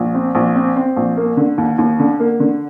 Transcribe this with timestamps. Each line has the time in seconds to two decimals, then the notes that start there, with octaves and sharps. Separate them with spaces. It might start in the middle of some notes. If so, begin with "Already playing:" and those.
Already playing: A#1
0.14 C4
0.35 A#1
0.55 C4
0.76 C4
0.97 A#1
1.17 A#3
1.37 D3
1.58 D#2
1.78 D#2
1.99 D3
2.20 A#3
2.40 D3